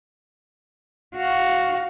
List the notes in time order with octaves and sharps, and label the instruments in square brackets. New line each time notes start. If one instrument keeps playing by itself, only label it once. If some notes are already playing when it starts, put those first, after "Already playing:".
[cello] F#4 F5